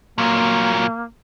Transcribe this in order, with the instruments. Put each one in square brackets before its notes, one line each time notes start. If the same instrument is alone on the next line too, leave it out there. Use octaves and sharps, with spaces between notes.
[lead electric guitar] A#2 F#3 [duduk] A#3